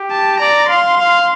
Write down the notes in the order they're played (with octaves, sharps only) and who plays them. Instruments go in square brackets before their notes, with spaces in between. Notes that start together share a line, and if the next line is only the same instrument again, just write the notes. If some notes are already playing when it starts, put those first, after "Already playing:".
Already playing: [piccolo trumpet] G4
[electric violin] A5
[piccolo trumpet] D5 [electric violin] A#5
[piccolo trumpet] F5 [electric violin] C6
[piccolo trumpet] F5